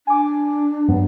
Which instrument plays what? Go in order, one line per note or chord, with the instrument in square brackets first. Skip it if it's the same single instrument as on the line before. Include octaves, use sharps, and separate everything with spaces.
[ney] D4 [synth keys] G#5 D6
[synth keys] G2 F#3 B3